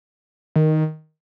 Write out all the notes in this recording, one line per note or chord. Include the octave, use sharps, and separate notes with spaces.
D#3